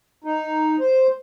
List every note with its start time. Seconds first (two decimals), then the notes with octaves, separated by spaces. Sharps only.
0.24 D#4
0.80 C5